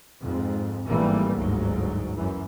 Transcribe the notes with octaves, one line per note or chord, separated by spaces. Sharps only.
F2 G#2
G#1 G2 E3 G3 A3 A#3
G1 D2 G#2 F#3
F#2 E3